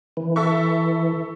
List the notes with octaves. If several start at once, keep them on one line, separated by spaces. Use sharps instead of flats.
E3
A4 E5 C#6